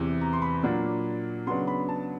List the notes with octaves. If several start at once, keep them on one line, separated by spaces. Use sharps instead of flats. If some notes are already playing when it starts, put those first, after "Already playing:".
Already playing: E2 C3 E3
A#5
C6
B5
A#2 F#3 A#3 D4
C#3 F#3 B3 D4 C6
B5
A5